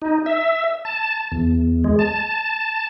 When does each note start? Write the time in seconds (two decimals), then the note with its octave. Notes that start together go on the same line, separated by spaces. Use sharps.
0.02 D#4
0.26 E5
0.85 A5
1.32 E2
1.84 G#3
1.99 A5